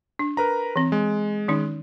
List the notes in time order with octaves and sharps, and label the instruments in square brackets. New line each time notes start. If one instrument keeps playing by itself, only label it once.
[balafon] D4
[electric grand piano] A#4 B4 A#5
[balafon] E3 C4
[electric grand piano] G#3
[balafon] D#3 C#4 D#4